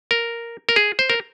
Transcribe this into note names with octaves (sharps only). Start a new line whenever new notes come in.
A#4
A#4
G#4
C5
A#4